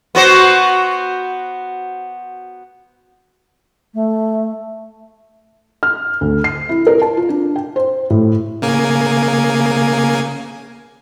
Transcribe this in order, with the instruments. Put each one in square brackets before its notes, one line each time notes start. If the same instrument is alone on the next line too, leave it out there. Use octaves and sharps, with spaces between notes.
[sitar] B3 F#4 C5
[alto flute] A3
[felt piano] F6
D2
C7
E4
A#4
A5
F4
D4
G5
C5
A2
[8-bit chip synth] C#3 A#3 G#5